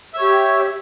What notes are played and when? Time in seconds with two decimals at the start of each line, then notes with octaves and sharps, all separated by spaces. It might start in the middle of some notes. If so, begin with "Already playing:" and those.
0.14 E5
0.18 C#5
0.22 G4